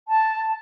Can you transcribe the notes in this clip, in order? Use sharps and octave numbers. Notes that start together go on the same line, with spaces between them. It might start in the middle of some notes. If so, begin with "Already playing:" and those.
A5